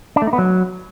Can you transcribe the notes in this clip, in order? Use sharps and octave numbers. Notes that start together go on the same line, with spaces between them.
D4
A3
D#4
B3
F#3